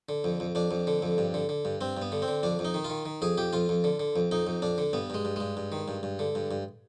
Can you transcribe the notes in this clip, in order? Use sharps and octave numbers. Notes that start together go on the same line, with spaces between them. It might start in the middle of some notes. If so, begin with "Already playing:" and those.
D3
F2
F2
F2 D4
F2
D3
F2
G2
D3
D3
G2
G2 C4
G2 B3
D3
C4
D3
F2 D4
F2
D#4
D#3
F4
D#3
D#3
F2 G#4
F2 G4
F2 F4
F2
D3
D3
F2
F2 D#4
F2
F2 D4
D3
G2 B3
G2 G#3
G2
G2 G#3
G2
D#3
G2
G2
D3
G2
G2